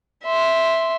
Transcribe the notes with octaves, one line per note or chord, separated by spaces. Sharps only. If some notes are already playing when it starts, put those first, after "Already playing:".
E5 C6